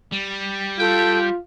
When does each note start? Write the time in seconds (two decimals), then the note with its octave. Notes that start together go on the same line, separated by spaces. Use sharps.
0.12 G3
0.79 F4 A4 F5 G5